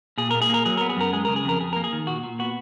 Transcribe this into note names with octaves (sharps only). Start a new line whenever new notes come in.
A#2 G#4
A#2 A#4
G#4
A#3 A#4
F#3 G#4
B3 A#4
G#4
F#2 A#4
G#3 G#4
C#3 A#4
G#4
F2 A#4
F2 G#4
A#3 A#4
G#4
D#3
A#2 F#4
A#2
B3 F#4